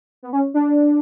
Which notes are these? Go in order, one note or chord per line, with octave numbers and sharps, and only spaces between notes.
B3
C#4
D4